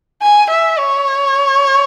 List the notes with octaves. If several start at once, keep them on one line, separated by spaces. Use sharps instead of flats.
G#5
E5
C#5